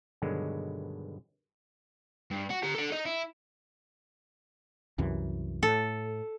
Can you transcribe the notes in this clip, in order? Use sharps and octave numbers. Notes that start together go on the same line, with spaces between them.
G2 B2 D3 D#3 F#3 G#3
G2
F#4
G4 A#5
A4 D5
D#4 D#5
E4
C2 F#2 E3
A2 A4